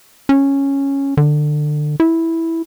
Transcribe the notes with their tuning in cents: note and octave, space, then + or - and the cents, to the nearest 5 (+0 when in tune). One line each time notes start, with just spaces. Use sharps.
C#4 -5
D3 +25
E4 -5